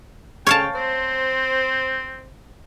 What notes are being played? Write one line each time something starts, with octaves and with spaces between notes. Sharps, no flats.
C#3 C#5 F5 G5 A5
C4 C5